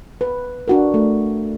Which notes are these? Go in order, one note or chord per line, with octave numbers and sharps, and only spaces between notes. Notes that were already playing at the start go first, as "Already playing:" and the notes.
B4
D4 F#4 A#4
A3